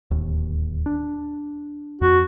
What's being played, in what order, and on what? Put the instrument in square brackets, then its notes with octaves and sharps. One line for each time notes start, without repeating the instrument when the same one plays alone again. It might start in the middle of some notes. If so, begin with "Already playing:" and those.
[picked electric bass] D1 D#2
D4
[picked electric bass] F2 [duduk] F#4